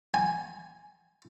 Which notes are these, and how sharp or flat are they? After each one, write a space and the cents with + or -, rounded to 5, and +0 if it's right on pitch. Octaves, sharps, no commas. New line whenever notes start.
G#5 +5